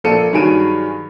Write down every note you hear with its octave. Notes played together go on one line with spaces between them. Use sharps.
A#1 A#3 A4 C#7 D#7
G2 D#3 F#3 G#4 D7 D#7